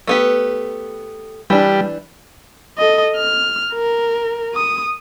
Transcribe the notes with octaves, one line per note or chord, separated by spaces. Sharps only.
A3 B3 G4
E3 G3 D4
A4 D#5
F6
A#4
D#6